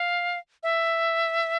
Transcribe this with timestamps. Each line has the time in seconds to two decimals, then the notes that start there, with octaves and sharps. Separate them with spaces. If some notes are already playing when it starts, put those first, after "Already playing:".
Already playing: F5
0.63 E5